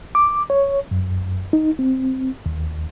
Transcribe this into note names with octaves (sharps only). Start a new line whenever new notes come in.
D6
C#5
F#2
D#4
C4
D#2